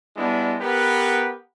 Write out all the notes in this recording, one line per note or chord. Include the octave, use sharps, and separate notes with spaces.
G3 G#3 B3 D4 E4
B3 G4 A#4 B4 F#5